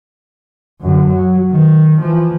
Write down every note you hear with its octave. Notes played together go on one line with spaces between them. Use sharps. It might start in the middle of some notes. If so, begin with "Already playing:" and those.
F#2 D3
F#3
D#3
E3 F3